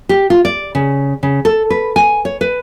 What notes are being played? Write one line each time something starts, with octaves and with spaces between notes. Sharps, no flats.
G4
F4
D5
C#3
C#3
A4
B4
G#5
C#5
B4